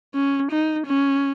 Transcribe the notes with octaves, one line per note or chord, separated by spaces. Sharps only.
C#4
D#4
C#4